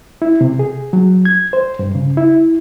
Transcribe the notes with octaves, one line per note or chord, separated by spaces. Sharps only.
E4
C3
G#4
F#3
G#6
C5
G2
C#3
E4